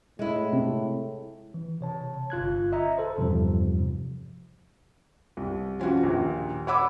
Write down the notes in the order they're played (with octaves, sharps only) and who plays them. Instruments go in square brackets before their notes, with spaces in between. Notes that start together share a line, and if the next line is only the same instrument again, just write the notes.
[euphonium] A2 [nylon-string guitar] G#3 E4
[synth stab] C3
[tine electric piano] E3
C3 C#5 A5
G1 F4 F#6 G#6
D#5 E5 A#5
A4 C5
E2 G2 C3 F3 G3
[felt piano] C2
F3 C#4 F4 F#4
A#1 D#2 A#2
C#5 F#5 B5 D6 E6